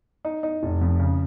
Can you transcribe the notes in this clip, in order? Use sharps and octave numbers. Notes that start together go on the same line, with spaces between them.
D#4
D#4
F1
F2
C#3